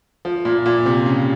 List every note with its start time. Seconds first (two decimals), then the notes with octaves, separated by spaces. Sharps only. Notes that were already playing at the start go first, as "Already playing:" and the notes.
0.25 F3
0.45 A#2
0.66 A#2
0.86 C3
1.06 C#3